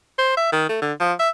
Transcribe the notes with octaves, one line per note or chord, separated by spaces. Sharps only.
C5
E5
D#3
A3
D3
F3
E5